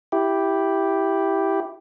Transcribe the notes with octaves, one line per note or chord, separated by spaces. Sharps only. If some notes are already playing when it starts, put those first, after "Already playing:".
E4 G4